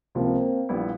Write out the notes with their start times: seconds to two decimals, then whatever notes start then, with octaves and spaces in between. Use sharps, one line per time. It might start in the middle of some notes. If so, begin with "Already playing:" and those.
0.15 C#2 C3 F3 A#3 C4
0.69 A#1 A#2 G3 B3 E4